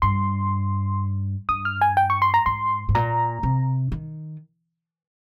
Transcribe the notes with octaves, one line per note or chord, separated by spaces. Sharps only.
G2 C6
G2 D#6
F6
G#5
G5
C#6
C6
A#5
G#2 C6
G#2
A#2 A#5
C3
D#3